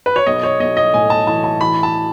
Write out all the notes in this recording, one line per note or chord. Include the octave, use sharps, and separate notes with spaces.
B4
C#5
B1 D#5
C#5
B1 D#5
D#5
A2 G#5
A5
E3 A5
A5
E3 B5
A5